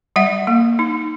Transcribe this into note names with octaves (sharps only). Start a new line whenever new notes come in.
G3 E5 F#5
A#3
D#4